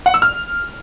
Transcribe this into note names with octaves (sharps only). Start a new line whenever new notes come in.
F#5
E6
F6